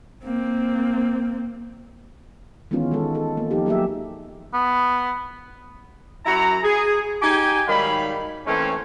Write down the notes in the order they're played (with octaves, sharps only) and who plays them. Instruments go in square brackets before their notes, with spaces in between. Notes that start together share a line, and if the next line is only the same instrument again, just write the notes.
[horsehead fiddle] A#3 C4
[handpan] D#3 E3 G#3 B3 C#4 F4
D#3 G#3 A4
A4
A#3
F3 D#4 G4
F#3 A#3 G4 G#4 E5
[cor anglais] B3
[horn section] F#2 E4 F#4 A#5
G#4
D#4 G4 G5 G#5
G#2 D#3 F#3 G3 F5 B5
E3 A3 A#3 C4 C#4